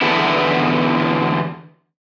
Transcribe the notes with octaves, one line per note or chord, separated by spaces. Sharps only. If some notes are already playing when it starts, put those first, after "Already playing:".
E2 D3 B3 E4